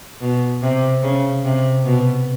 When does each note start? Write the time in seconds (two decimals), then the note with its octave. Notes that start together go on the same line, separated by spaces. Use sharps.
0.21 B2
0.62 C3
1.03 C#3
1.44 C3
1.85 B2